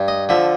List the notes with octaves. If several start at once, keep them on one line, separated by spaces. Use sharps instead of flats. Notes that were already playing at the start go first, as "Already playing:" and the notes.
Already playing: G2
D#5
D3 F3 E5